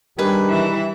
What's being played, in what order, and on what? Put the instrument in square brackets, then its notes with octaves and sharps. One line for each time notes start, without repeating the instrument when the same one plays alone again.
[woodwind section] D#3 D4 G4 [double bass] G3 [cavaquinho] G#4 B4
[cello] E3 E5